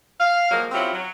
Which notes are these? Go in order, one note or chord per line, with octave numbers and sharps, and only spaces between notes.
F5
F3 F#3 G#3 A#3
F#3 C4 C#4 E4 F4 G4
F#3